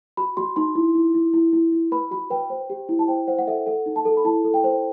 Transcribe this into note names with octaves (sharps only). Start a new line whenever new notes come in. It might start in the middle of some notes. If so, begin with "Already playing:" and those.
F#4 B5
F#4 C6
D#4 C6
E4
E4
E4
E4
E4
E4
B4 B5
F#4 B5
B4 G5
C5
G4
E4
A5
C5 G5
C5 F#5
F#5
A4 E5
A4 F#5
D#4
A5
A4
B5
E4 A5
A4
G5
C5